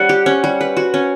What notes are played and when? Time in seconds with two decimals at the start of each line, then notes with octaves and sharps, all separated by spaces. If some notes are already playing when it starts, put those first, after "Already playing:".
Already playing: G3 C#4 F#5
0.09 G4
0.26 C#4
0.44 G3
0.61 B4
0.77 F#4
0.94 C#4